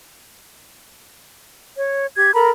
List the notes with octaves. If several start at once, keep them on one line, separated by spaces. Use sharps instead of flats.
C#5
G4 G#6
A4 A#4 A#5 B5